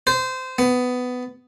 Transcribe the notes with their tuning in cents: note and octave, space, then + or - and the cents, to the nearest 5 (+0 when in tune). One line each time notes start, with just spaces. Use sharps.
C5 -20
B3 +15